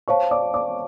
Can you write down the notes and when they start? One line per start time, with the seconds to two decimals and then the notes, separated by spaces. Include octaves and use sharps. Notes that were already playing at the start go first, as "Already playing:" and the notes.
0.08 C5 C#5 F5 A5 C#6
0.31 D5 D6
0.53 D5 D6